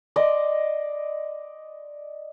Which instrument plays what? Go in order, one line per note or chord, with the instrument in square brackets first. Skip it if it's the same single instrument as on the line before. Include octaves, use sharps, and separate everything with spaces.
[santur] D5 D#5 C6